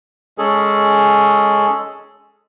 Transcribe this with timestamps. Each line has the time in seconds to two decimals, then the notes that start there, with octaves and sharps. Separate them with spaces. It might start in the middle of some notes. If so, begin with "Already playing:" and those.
0.38 G#3 C#4 G#4 A4